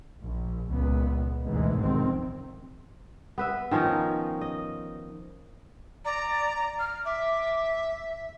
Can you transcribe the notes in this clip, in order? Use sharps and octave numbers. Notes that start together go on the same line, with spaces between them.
A#1
C#2 A#2 B3
G#1 D2 G#2 B2 E3 G#3
F1 C2 D#3 C4
B3 B4 E5
D#3 F3 C#4 D#4
D#5
D5 A#5
F6
E5 D6